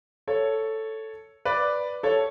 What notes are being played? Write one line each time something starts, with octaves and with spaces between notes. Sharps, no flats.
A4 C#5
B4 D5
A4 C#5